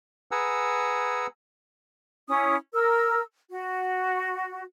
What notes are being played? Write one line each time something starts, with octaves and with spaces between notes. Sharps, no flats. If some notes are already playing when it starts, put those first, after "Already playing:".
G#4 B4 F#5 G#5 A#5 E6
C#4 E4 D#6
A#4 E6
F#4